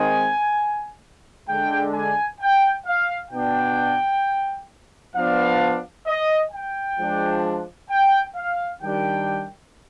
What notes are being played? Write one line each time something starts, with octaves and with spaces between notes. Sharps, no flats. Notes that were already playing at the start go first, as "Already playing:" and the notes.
Already playing: D#3 G#3 C4 D#4 G#5
D3 G#3 D4 G5
G#5
G5
F5
B2 B3 D4 G5
F3 B3 D4 F5
D#5
G5
F3 G#3 D4
G5
F5
D#3 G3 D4 G5